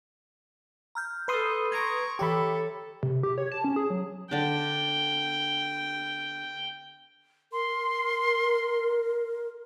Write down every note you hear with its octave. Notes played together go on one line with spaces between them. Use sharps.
A#5 F6 G6
A4 B4 C6 D#6
A#5 C#6 G#6 D7
E3 G4 A4 C#5 B5 C#7
C3
G4
C#5
A5
C#4
G#4
F#3
D3 D4 G5
A#4 C6